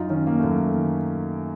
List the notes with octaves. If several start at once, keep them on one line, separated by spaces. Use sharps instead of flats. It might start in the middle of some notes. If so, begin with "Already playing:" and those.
Already playing: F#2 D#4 F4
D#3 C#4
A#3
F#2 A3
A3
D#3